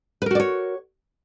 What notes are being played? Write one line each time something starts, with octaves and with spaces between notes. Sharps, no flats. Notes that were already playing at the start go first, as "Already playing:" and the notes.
F#4 A#4 B4 C#5 D5